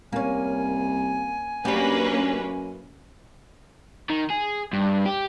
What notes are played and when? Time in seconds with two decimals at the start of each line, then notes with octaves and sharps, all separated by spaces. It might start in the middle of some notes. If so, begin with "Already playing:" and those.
0.13 C2 A#3 C#4 G#5
1.65 F#2 A#3 C#4 D4 G4 B4
4.10 D#3
4.30 G#4
4.73 G2
5.06 G4